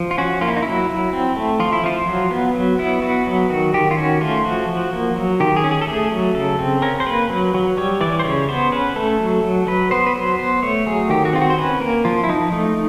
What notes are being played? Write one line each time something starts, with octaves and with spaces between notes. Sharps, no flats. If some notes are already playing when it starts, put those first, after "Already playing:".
Already playing: F3
F4
C#4 F#4
A#3 F4
E4
D#4
F#3 E4
F#3
C4
A3
F3 F4
E4
F3 F4
F#3
B3
F#3
B3 E4
B3 F#4
F#3
D#3 F#4
D#3 G4
F4
C#4 F#4
A3 F4
F3 F#4
F3
A#3
F#3
D#3 G4
G#4
C#4
G#4
A4
A3 G#4
F#3
C#3 A4
C4
C#4 A#4
C5
A#3 B4
F#3
F#3
G3 C#5
E3 D5
C5
C#3 C#5
B3 C5
C#4 B4
A3 A4
F#3
F#3
F#3 B4
B3 C5
B4
F#3 C5
B3 C5
A3 C#5
F#3 G#4
D#3 G4
F#4
C4 F4
F#4
C5
C#4 B4
A#3 A#4
F3 F4
E4
F3 D#4
A3 D#4